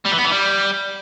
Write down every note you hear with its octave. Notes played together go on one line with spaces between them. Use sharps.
G3
E3
B3
E3
G3